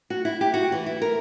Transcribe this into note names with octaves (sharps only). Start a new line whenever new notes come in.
F#4
E4
G4
F#4
E3
E4
A#4